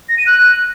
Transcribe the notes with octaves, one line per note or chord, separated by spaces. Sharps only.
A#6
D#7
F#6